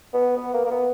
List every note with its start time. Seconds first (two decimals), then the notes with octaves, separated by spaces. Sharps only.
0.14 B3
0.37 B3
0.54 A#3
0.65 A#3
0.71 B3